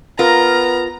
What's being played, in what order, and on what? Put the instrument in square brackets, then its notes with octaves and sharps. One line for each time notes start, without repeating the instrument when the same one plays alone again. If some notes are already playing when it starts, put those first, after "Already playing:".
[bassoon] B3 [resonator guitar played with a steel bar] F4 A#4 [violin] A#5